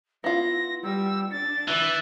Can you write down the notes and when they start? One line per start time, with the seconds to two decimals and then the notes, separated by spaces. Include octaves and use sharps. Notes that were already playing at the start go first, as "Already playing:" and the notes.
0.24 B3 E4 F4 A#6
0.83 G3 E6
1.31 D4 A6
1.68 E3